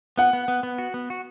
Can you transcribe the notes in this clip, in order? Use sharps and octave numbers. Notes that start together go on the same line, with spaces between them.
B3 F#5
B3
B3
B3
F#4
B3
F#4